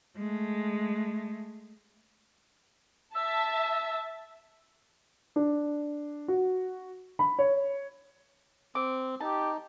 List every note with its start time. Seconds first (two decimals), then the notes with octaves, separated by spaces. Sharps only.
0.17 G#3 A3
3.15 E5 A5 E6
5.36 D4
6.28 F#4
7.19 B5
7.39 C#5
8.75 C4 D6
9.20 D#4 G4 A5